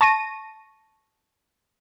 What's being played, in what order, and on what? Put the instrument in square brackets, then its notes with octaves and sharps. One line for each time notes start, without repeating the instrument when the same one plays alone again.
[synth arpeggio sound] A5 C#6 A#6 D#7